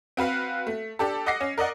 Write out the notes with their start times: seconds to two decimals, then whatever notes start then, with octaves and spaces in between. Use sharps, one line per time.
0.17 C4 F#4 B4 F5
0.67 A3
0.99 D4 G4 A4
1.26 D#5 F#5 D6 A#6 C7
1.41 C#4
1.58 A#4 D5 D#5 F#5